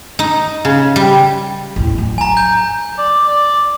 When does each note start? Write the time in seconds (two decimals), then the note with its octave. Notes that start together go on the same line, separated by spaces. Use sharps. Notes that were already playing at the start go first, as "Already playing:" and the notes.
0.19 D#4
0.65 C#3
0.96 G3
1.76 A1 E2
1.98 F#3
2.18 G#5 A#5
2.37 G6
2.98 D5
3.28 D5